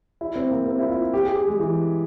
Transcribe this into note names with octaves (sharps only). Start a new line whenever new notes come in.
E4
C4
A#3
C4
E4
F4
G4
G#4
G4
G#3
E3